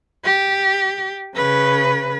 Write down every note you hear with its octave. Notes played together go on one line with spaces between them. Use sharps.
G4
C#3 B4